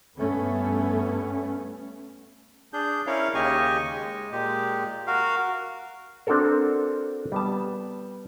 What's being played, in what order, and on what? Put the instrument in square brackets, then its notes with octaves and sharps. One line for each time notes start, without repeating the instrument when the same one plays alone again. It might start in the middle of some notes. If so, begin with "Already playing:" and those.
[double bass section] G2 A3 B3 C#4
[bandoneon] D4 G#4 G6
C#4 E4 A#4 C#5 F5
D#2 C#3 G4 D#5 G#5 C#6
G#3
A#2 G#3 G4
F#4 A#4 F5
[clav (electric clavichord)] C4 D4 F#4 A4 A#4
G3 B3 A5